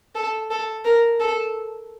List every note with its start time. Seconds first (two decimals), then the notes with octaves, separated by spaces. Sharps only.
0.15 A4
0.51 A4
0.85 A#4
1.20 A4